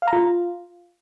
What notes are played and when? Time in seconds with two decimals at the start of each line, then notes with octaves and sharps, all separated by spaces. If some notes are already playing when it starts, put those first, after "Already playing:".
0.02 F5
0.07 A#5
0.13 F4